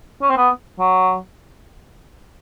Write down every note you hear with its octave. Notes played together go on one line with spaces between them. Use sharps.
C#4
C4
B3
F#3